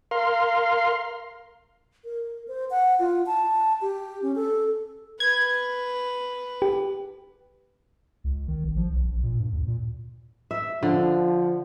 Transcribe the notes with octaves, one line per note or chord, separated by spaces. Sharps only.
A#4 F5 C6
A#4
C5
F#5
F4
A5
G4
C#4
A4
B4 G#6
G4
C#2
D#3
A1
F3
B1
A#1
A#2
G2
D#2
A#2
E5
D3 F3